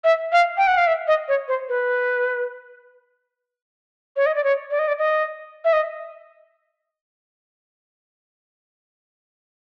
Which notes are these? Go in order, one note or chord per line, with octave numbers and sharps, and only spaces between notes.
E5
F5
G5
F#5
F5
E5
D#5
C#5
C5
B4
C#5
D#5
D5
C#5
D5
D#5
D5
D#5
E5
D#5